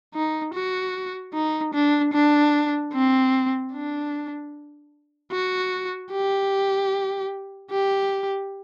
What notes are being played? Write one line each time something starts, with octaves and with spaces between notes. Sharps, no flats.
D#4
F#4
D#4
D4
D4
C4
D4
F#4
G4
G4